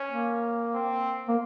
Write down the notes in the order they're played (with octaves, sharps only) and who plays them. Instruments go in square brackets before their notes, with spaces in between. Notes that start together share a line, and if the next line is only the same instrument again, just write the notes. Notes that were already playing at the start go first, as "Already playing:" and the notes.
Already playing: [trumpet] C#4
[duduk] A#3
[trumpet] C4
[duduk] A#3